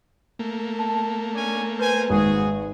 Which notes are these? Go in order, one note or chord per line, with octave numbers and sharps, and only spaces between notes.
A3 A#3
A5
C#4 D4 G#5
B4 C5 G#5
G#1 F#4 G#4